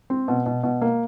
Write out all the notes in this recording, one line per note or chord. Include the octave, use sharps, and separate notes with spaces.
C4
B2
B2
B2
A#3